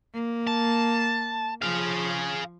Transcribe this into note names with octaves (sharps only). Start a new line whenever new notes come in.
A#3
A5
F3 G#4 F5